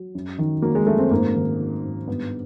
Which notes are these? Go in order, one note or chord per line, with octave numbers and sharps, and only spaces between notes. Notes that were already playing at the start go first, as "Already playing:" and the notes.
Already playing: F#3
F#2
D#3
F#3 A#3
G#3
F#2 A3
C4
G#2 A#3
D#3
F#3
G#2
G2 B3